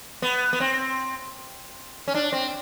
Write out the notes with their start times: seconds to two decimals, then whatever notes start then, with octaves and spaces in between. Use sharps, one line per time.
0.22 B3
0.53 B3
0.60 C4
2.08 C#4
2.14 D4
2.33 C4